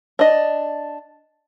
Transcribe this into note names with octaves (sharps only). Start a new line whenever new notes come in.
D4 D#5